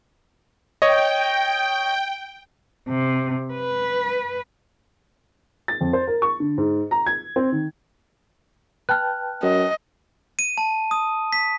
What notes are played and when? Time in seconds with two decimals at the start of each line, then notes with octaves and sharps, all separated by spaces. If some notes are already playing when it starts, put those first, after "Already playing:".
0.82 C#5 D#5 G5
2.88 C3
3.54 B4
5.68 A6
5.81 F2
5.93 C5
6.07 A#4
6.22 C#6
6.40 D3
6.58 G#2
6.91 A#5
7.06 G#6
7.36 C4
7.52 D#3
8.89 B4 G5 A5 F6 F#6
9.43 F#2 D#5
10.39 D#7
10.58 A5
10.91 D#6
11.33 B6